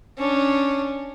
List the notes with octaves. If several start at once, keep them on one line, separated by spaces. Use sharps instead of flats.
C#4 D4